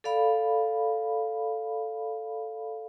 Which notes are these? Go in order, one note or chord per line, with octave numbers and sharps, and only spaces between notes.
A4 D5 F5 B5